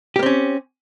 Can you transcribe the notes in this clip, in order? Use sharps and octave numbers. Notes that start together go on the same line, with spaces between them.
A#3 C4 C#4 G4